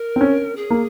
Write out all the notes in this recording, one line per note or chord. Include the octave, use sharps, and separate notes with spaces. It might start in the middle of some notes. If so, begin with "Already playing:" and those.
Already playing: A#4
C4
C#4
G#4
A#3